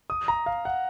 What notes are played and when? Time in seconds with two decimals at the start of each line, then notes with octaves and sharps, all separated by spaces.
0.10 D#6
0.28 A#5
0.46 F5
0.65 F#5